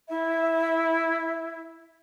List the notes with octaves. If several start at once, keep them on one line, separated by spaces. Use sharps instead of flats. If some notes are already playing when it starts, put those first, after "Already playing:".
E4 E5